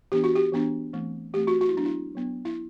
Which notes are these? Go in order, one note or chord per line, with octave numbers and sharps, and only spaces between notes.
E3 B3 D4 G4
F#4
G4
E3 B3 D4
E3 A3 C4
E3 A3 C4 G4
F#4
F#4
E4
F#3 B3 D4
E4
F#3 B3 D4
E4